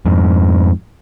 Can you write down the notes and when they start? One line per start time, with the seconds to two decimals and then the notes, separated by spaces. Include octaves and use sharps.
0.06 F2 G#2